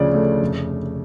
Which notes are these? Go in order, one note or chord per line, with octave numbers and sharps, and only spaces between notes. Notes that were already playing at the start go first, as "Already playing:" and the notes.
Already playing: D2 C#3 F3 D5
A3
F1